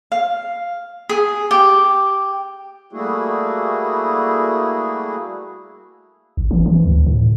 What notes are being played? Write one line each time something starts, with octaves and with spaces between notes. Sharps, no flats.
F5
G#4
G4
G3 A3 A#3 E4 F#4 G#4
G#1
E3
E3
D2
A2